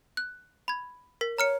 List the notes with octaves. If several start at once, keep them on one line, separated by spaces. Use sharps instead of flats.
F#6
B5 G#6
A#4 B6
C#5 A#5 F6 C#7